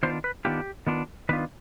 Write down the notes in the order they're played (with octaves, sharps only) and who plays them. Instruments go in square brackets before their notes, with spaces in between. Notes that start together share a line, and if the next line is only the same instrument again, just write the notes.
[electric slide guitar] D#3 B3 D4 F4 C5
B4
D#3 B3 D4 F4 G4
D#3 B3 D4 F4
D#3 B3 D4 F4 B4